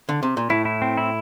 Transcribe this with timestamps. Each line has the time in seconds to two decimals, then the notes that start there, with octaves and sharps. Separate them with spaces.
0.09 D3
0.23 C3
0.37 A#2
0.50 A2 E4
0.65 E4
0.82 C4
0.97 E4